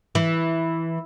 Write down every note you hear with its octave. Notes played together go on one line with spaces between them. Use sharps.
E3